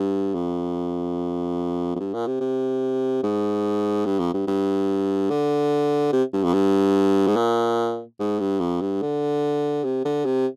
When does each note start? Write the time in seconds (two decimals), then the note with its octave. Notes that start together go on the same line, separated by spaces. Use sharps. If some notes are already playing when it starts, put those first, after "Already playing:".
Already playing: G2
0.34 F2
1.95 F2
1.99 G2
2.14 A#2
2.27 C3
2.40 C3
3.23 G#2
4.06 G2
4.19 F2
4.34 G2
4.47 G2
5.30 D3
6.12 C3
6.33 G2
6.44 F2
6.54 G2
7.27 G#2
7.36 A#2
8.19 G#2
8.40 G2
8.60 F2
8.81 G2
9.02 D3
9.84 C3
10.05 D3
10.25 C3